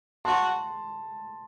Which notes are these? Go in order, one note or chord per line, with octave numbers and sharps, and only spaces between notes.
F#4 A5 C6